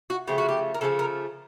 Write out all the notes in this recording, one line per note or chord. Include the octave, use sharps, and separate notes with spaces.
F#4
C#3 F3 A3 G4
F#4
G4
A#4
C#3 F3 A3 A4
A#4